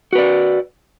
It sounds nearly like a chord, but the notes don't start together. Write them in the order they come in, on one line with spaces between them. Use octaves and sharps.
F#4 B4 D5